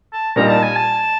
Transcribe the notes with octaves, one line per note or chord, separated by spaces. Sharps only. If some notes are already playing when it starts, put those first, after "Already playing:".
A5
A#2 G3 A#3 D#4 A#5
A5
G#5
A5